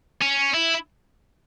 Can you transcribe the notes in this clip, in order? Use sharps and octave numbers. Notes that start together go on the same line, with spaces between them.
C#4
E4